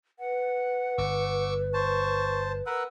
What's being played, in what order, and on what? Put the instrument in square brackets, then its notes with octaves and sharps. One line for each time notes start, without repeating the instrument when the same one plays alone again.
[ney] B4 [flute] F#5
[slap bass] G1 [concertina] C#6 D6 E6
[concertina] C5 A5 [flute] C#6
[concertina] A#4 B4 F#5 [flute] E6